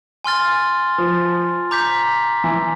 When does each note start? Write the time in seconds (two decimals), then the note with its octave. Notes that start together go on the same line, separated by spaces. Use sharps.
0.24 G#5 C6 F6 A6
0.98 F3
1.71 A#5 D6 G6 B6
2.44 E3